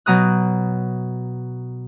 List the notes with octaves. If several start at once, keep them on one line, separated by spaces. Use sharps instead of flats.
B2 F#3 A#5 D#6 F#6